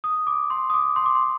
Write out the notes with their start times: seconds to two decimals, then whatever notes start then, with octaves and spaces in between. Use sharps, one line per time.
0.04 D#6
0.27 D6
0.50 C6
0.70 D#6
0.74 D6
0.96 C6
1.06 D6
1.15 C6